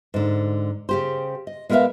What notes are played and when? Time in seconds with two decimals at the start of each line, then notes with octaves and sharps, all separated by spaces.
0.14 G#2 D3
0.89 C#3 G4 C5
1.47 D#5
1.69 G#3 B3 A#4 C#5 E5 F5